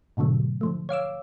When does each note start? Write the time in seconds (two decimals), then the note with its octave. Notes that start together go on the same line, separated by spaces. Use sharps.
0.17 G#2 B2 D3 F#3 A3
0.61 D3 F3 A3
0.89 C#5 F5 D6 E6